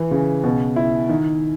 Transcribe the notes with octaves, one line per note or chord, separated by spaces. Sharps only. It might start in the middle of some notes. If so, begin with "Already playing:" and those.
Already playing: E3
C#3
B2
E4
D#3